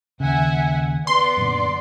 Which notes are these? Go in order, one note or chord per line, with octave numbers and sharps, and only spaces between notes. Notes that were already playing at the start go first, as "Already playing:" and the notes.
D#2 C#3 E5 F#5 G#5
B3 D5 C6
F#2 A#2 D3